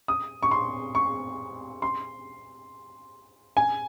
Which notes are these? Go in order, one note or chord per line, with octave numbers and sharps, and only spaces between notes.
D#6
C#6
C6
C#6
C6
G#5